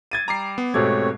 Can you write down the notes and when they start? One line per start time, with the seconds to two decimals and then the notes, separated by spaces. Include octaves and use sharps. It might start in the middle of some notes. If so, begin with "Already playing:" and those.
0.11 G#6 A6 D#7
0.28 G3 A#5 D6 C7
0.58 B3
0.74 G#2 B2 A3 C4 G4 A4 C#5 G#6